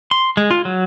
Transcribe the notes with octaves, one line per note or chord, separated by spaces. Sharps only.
C6
G#3
F4
F#3